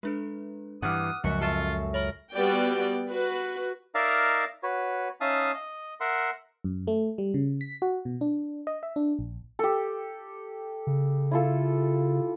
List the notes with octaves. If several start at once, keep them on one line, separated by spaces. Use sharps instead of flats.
G#3 D4 A4 B4
G2 E3 F#5 D6 D#6 F6
C#2 F#2 F3 F#4 D#5
F4 A4 E5 C#6
A#4 C#5 B5 F#7
G3 B3 F#4 D5 G5
F#4 B4
D#4 A#4 D5 E5 F5 A#5
F#4 B4 C#5
C#4 D#4 E5 F5 A5 D#6
D#5
A#4 E5 F#5 C6
F#2
A3
G3
C#3
B6
F#4
B2
D4
D#5
E5
D4
A#1
G4 A4
C#3
E4 F4 A4